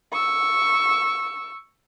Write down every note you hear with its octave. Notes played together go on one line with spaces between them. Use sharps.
C#6 E6